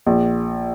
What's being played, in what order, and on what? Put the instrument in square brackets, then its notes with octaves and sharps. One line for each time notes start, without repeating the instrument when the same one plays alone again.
[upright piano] A#1